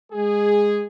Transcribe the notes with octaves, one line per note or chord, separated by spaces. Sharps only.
G#3 G#4